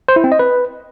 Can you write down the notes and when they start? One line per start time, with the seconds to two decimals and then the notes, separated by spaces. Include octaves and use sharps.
0.08 C5
0.16 E4
0.24 C4
0.32 D#5
0.39 B4